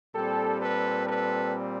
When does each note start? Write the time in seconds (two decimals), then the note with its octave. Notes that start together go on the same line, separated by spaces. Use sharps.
0.14 A#2 G3 C4 G4 A4
0.61 A4 B4
1.06 A4 B4